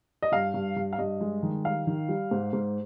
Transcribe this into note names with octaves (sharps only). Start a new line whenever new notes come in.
D#5
G2 F5
G2
G2
F5
G2 D#5
G#3
D#3
G3 F5
D#3
G3
G#2
G#2